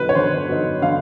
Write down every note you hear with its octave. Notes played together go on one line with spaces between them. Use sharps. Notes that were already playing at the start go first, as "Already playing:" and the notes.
Already playing: D3 F#3 B3 D#4 B4
C#5
D3 C5
F#3 B3 D#4
D3 F5